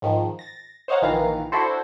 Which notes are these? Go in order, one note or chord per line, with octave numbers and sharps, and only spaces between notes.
G#2 D#3 F3
A6 A#6
C5 C#5 D#5 F5 F#5 A#5
A#1 D#3 E3 F5 A#5
D4 E4 F#4 A4 C5